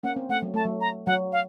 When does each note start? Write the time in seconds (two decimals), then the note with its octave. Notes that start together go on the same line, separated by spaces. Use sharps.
0.03 A#3 C#4 F#5
0.16 C4
0.29 A3 F#5
0.42 F#3
0.54 A3 A5
0.65 F#3
0.81 A#5
1.07 F#3 F#5
1.32 F5